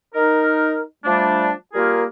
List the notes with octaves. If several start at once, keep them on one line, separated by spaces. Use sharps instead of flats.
D#4 A#4
F3 G3 A3 D4
G3 A#3 F4 G#4 A#4